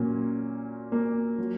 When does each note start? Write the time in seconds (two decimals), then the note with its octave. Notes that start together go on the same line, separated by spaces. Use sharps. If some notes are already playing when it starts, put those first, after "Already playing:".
Already playing: A#2 F#3 A#3 C#4
0.92 A#3
1.38 F#3